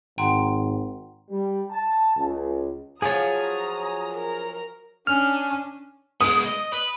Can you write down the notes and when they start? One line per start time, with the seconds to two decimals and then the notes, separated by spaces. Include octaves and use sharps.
0.18 G#1 F#5 G5 A#5 C6
1.30 G3
1.71 A5
2.16 C#2
3.02 F3 F#3 G#4 C#5 A5 A#5 D#6
4.13 A#4 A#5
5.07 C#4 D4 F6
6.21 G#3 B3 D#6
6.46 D#5
6.73 B4